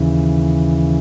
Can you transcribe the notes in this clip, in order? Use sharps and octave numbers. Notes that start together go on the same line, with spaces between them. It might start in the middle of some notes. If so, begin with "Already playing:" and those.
Already playing: D#2 C#3 E3